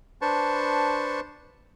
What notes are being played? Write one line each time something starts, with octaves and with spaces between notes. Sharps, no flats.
D4 B4 C5 A5 C#6